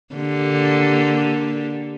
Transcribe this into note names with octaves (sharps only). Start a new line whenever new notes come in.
D3 A#3 G4